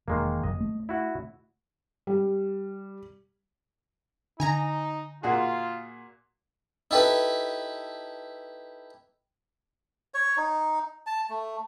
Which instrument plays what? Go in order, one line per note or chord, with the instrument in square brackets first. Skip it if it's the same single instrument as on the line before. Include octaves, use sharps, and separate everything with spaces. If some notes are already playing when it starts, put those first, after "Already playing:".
[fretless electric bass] E1 [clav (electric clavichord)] D#3 G#3 A#3
[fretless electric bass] F#1 [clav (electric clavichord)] D#5
[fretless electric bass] A3
[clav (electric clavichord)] E4 F#4
[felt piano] G3
[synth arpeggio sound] D3 [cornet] D#4 [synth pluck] G#5 A#5 A#6
[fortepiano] A#2 F#4 G#4 [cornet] F4
[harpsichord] D#4 E4 G4 A4 B4
[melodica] C#5
D#4
A5
A3